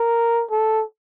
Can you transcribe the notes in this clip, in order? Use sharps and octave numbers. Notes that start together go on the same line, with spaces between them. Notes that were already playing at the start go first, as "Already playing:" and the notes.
Already playing: A#4
A4